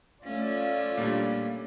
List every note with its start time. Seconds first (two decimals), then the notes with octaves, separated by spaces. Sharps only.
0.24 A3 C#4 F4 D5
0.97 A#2 G3 D4